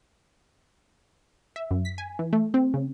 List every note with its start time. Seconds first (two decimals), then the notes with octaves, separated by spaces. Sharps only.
1.56 E5
1.71 F#2
1.85 B6
1.98 G#5
2.19 E3
2.33 A3
2.54 C4
2.74 C#3